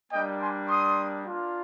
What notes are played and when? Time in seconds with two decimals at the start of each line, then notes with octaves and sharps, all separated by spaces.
0.11 G3 A#3 D4 D#5 G5
0.40 G#5 C6
0.68 C6 D#6
1.25 A#3 D4 F4